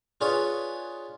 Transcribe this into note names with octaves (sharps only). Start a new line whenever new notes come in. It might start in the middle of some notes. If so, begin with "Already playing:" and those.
D4 F4 G#4 B4 C#5